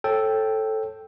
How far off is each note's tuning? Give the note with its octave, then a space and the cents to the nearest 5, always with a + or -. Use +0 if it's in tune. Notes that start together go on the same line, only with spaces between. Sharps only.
A4 +0 C#5 -35 G5 +0